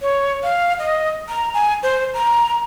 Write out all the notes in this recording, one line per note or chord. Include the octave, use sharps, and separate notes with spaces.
C#5
F5
D#5
A#5
G#5
C5
A#5